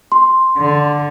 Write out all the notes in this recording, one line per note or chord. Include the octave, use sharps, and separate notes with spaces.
C6
D3